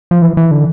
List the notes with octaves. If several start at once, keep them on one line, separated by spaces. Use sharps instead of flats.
F3
E3
E3
D3